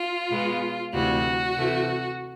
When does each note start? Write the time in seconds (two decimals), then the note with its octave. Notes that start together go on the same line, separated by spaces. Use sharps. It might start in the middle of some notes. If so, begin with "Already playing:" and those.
Already playing: F4
0.30 B2 G#3 B3
0.93 D2 C3 E3 G3 F#4
1.56 C3 E3 A3